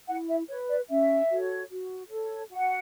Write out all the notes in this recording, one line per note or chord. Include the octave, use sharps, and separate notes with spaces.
E4 F#5
E5
B4 C#5
D5
C#4 E5
F#4 A4 C#5
F#4
A4 C#5
F#4 F#5